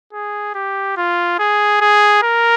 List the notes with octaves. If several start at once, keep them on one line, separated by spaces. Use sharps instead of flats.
G#4
G4
F4
G#4
G#4
A#4